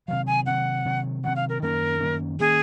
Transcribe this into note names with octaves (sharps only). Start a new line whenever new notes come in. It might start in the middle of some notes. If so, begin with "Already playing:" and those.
C3 D#3 F#3 F5
G#5
C3 D#3 F#3 F#5
C3 D#3 F#3
C3 D#3 F#3 F#5
F5
A#4
F#2 D#3 A#3 C#4 A#4
F#2 D#3 A#3 C#4
D#3 A#3 C#4 G#4